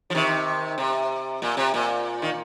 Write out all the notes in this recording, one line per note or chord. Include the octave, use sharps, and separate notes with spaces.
F3
C3 D#3
C3
A#2
C3
A#2
D#3